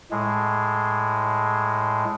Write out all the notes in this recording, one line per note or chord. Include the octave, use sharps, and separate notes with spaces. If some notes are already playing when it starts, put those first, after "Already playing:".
A2 G#3